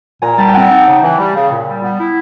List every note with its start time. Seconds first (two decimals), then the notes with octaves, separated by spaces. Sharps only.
0.22 A#2 G#5 A#5
0.38 G3 G5 A5
0.48 G5
0.54 C4 F#5 G#5
0.70 D#4 G5 A5
0.86 C#3
1.02 E3
1.19 G3
1.34 C#3
1.50 A#2
1.67 G3
1.83 B3
1.99 E4